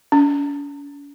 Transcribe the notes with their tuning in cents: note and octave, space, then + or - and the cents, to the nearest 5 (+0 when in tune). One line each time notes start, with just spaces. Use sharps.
C#4 +45